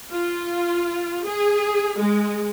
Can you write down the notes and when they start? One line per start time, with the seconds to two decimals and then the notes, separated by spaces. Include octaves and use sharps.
0.11 F4
1.25 G#4
1.98 G#3